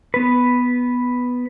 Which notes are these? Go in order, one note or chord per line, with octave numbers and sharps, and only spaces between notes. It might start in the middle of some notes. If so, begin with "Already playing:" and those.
B3 B4